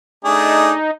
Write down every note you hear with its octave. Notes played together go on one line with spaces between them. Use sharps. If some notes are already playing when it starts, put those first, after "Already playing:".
A3 D4 D#4 G#4